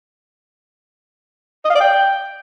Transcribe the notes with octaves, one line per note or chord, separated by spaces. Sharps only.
D#5
F5
D5
G5